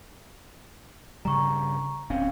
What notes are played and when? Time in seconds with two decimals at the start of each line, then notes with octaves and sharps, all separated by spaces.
1.25 G2 C#3 G3 A#5 C#6
2.10 D1 C4 C#4 F5